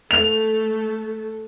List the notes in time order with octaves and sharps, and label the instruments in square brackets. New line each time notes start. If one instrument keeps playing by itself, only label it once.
[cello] A3 A4 [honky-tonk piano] F7